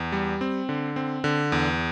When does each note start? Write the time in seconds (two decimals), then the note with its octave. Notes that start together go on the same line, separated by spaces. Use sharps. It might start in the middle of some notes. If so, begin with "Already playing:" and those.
Already playing: E2
0.12 G3
0.41 C4
0.69 D3
0.96 C4
1.24 D3
1.52 E2